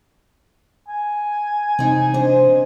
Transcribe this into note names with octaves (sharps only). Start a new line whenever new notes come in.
G#5
C3 C4 D#4
D4 C5 D#5